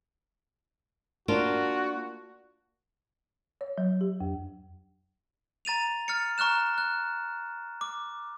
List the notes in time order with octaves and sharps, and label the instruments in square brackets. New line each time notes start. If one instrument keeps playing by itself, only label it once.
[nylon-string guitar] A#3 D4 F4 [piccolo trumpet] F#4
[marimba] C#5
F#3
G4
F2
[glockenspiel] A#5 A6 D#7 F7
F6 A6 C#7
A#5 C#6 F6 F#6 E7
F#6
D6